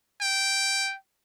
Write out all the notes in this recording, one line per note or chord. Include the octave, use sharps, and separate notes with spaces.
G5